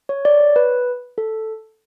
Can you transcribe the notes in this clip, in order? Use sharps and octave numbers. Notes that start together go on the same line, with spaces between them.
C#5
D5
C#5
B4
A4